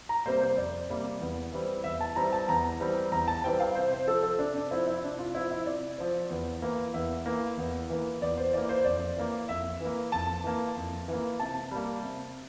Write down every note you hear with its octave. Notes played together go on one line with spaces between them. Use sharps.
A#5
C3 G3 A#3 C5
C5
F2 D5
C3 G3 A#3
E2
E3 G3 C4
E2 E5
A5
E3 G3 C4 A#5
A5
E2 A#5
E3 G3 C4
E2 A#5
A5
E3 G3 C4 G5
F5
C3 C5
C5
F3 C4 A4
A4
C3 D4
D4
F3 C4 E4
E4
C3 D4
F4
F3 C4 E4
E4
C3 D5
F3 C4
E2
E3 A#3
E2 E5
E3 A#3
E2
E3 A#3
E2 D5
C5
E3 A#3 D5
C5
F2 D5
E3 A#3
F2 E5
E3 A#3
F2 A5
E3 A#3
F2
E3 A#3
C3 A5
G3 A#3
C3